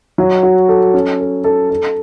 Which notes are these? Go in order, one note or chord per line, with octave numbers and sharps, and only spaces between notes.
F#3
F#4
A4
C#4
A4
A4
A4